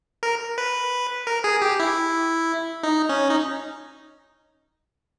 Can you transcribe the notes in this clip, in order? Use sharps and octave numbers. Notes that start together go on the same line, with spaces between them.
A#4
B4
A#4
G#4
G4
E4
D#4
C#4
D#4